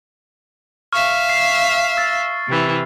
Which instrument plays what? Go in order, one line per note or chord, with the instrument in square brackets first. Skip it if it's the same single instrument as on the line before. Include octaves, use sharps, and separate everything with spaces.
[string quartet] E5 F5 [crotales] C#6 F6
[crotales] C7
E6 A6
[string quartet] C3 E3